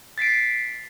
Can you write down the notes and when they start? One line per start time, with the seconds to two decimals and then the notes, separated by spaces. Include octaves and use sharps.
0.18 A6 B6 C7 D7